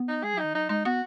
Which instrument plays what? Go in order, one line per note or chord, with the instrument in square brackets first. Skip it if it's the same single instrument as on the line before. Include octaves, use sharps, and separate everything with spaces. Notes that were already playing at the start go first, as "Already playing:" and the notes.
Already playing: [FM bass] B3
[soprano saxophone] D#4
[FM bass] G#3 [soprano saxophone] G#4
[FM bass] F#3
[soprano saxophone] D#4
[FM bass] D#3
[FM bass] F#3 [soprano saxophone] D#4
[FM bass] G#3 [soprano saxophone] D#4
[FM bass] B3 [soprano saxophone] F#4